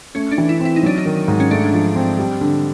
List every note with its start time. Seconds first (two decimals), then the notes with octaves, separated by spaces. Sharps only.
0.15 A3 C#4
0.32 D4
0.38 E3
0.49 E4
0.60 C4
0.65 E4
0.76 D#4
0.83 F#3 D4
0.98 D#4
1.05 D#3
1.28 G#2
1.40 C#4
1.51 A3 D4
1.73 F3
1.96 C4
2.19 G3
2.41 D3